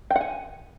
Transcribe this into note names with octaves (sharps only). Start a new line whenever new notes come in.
G5
F#5
G#5